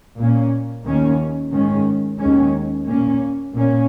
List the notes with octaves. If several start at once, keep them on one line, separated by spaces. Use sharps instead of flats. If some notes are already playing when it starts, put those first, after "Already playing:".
A#2 A#3 C#4
D#2 D#3 A#3 C#4
G#2 D#3 G#3 C#4
D#2 D#3 G#3 C#4
A#2 A#3 C#4
A#2 A#3 C#4